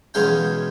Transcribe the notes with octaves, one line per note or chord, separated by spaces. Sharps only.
E2 B2 G#3 C#4 F5 G5